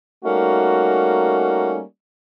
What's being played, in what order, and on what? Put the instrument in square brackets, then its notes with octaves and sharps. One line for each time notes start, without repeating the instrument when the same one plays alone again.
[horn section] G3 A3 A#3 C#4 D#4 F#4